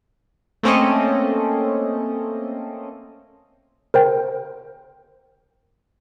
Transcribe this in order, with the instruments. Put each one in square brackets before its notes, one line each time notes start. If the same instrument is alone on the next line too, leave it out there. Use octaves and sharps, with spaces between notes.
[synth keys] A3 A#3 C4 C#4 A4 D#5
[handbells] A#4 C5 G5